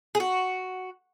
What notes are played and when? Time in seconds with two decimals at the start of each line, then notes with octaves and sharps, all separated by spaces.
0.15 G#4
0.20 F#4